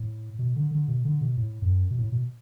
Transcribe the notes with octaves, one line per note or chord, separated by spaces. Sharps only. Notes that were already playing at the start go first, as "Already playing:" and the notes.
Already playing: A2
B2
D3
D3
B2
D3
B2
A2
F#2
B2
A2
B2